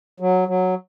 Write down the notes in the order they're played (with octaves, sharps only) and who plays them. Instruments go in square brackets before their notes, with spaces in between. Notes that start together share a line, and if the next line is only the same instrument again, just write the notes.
[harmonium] F#3
F#3